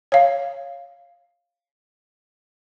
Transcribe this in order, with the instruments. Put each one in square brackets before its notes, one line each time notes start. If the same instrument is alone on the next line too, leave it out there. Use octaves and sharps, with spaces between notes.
[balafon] C#5 F5